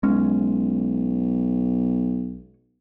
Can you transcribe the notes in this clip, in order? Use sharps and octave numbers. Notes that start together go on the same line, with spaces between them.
B1 G#3 C#4